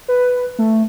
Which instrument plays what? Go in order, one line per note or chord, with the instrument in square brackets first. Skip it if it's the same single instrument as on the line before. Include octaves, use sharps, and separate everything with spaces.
[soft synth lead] B4
A3